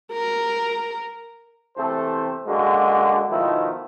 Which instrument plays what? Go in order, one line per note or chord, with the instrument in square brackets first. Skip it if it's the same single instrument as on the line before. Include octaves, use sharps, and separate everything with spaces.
[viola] A#4
[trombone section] E2 C3 E3 A3 A4 C5
F#2 D3 G#3 A#3 F#4
B2 D#3 F3 A3 D#4 E4